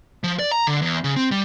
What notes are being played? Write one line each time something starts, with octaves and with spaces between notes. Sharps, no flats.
F3
D5
A#5
D3
E2
C#3
C4
G3